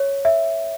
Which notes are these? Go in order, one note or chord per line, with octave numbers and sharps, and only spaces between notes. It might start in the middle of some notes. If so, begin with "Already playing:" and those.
Already playing: C#5
E5